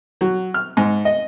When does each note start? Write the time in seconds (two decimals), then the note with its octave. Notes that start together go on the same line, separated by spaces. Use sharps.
0.21 F#3
0.54 F6
0.77 G#2
1.05 D#5